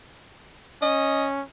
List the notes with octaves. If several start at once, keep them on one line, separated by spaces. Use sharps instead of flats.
C#4 D#5